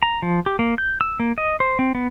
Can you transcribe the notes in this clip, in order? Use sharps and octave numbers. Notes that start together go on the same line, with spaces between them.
A#5
F3
G4
A#3
G6
E6
A#3
D#5
C5
C4
B3